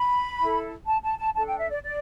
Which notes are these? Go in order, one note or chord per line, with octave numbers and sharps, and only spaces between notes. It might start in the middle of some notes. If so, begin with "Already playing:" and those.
Already playing: B5
E4 A4
A5
A5
A5
D4 A4 A5
G5
E5
D5
D5